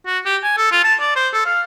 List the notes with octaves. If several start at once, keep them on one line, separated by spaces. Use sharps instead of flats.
F#4
G4
G#5
A4
F4
A5
D5
C5
A4
F5